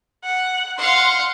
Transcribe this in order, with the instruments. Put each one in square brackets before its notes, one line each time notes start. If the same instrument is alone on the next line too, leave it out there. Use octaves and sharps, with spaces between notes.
[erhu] F#5
[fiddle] F5 F#5 [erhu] C6